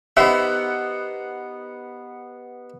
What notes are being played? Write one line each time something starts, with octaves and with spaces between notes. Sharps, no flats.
B3 D#4 G4 C5 E5 F#5